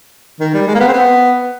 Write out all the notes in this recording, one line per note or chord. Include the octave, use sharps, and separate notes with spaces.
D#3
G3
G#3
A#3
B3
C4
B3